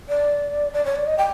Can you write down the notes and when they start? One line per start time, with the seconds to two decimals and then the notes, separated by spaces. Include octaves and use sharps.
0.09 D5
0.74 D5
0.85 C#5
0.96 D5
1.07 D#5
1.18 G5